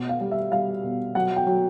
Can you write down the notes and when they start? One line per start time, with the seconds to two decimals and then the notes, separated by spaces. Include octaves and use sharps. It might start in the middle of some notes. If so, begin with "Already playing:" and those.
Already playing: B2
0.09 F5
0.21 G3
0.32 E5
0.52 G3 F5
0.83 B2
1.15 F#3 F#5
1.36 G5
1.47 F#3